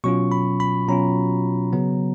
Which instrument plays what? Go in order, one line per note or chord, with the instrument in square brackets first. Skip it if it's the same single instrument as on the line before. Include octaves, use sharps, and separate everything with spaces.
[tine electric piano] B2 F#3 C#4 F4 C#6
B5
B5
B2 F#3 C#4 F4 A#5
C#3 F#3 B3